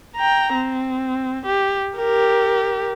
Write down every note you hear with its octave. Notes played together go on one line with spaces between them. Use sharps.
G5 A#5
C4
G4
G4 A#4